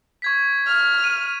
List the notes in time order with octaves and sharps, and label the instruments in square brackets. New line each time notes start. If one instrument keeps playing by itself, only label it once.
[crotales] C#6 G#6 B6
[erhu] F6
[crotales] D#7